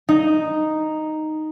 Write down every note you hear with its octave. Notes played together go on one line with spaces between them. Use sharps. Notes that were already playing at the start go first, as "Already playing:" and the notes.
D#4